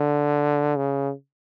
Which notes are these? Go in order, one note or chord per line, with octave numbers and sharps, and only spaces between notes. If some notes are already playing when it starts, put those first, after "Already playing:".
Already playing: D3
C#3